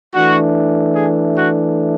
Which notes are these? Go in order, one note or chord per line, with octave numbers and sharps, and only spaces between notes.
E3 A3 D4 F#4
G#4
F#4